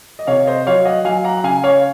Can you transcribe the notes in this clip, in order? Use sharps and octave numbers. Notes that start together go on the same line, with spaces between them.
D#5
C3 C#5 F5
C5 D#5
F#3 C#5 F5
D#5 F#5
F#3 F5 G#5
F#5 A#5
A#5
C#3 F5 G#5
C#5 F5